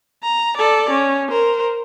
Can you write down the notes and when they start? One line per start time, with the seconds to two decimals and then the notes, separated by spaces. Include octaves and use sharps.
0.22 A#5
0.57 A4 D5
0.90 C#4
1.29 A#4 C5